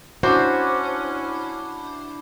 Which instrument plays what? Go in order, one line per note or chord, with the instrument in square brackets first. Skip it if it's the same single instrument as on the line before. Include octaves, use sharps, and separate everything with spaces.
[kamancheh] C#4 [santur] D4 E4 [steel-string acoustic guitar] F#4 [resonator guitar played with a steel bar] C5